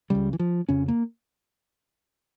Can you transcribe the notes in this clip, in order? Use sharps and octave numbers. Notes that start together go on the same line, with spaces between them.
C#2 C#3 G3
E3
F3
F2 C#3 C#4
A#3